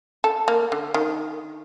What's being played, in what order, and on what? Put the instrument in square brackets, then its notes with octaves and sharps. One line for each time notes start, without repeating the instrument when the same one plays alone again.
[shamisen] A4
A#3
D3
D#3